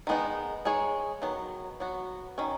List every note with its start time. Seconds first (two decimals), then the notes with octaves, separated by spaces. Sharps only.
0.07 D#3 G#3 B3 D#4
0.65 G#3 D#4 G#4 C#5
1.22 D#3 F#3 B3
1.80 F#3 B3 F#4
2.38 D#3 F#3 C#4